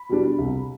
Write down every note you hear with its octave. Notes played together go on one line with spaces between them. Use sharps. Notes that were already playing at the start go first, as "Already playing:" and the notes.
Already playing: B5
B2 G3 D4
C2